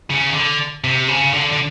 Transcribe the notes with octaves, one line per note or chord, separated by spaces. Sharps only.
C#3
D#3
D3
C3
C#3
D3
D3